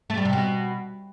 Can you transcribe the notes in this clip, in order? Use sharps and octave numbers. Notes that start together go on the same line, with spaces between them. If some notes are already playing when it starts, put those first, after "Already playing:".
A3
G3
C3
B2